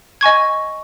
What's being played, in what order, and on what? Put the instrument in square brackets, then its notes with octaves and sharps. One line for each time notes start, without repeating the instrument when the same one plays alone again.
[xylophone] D#5 G#5 C#6 G#6